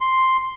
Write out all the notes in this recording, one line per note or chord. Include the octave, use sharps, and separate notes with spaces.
C6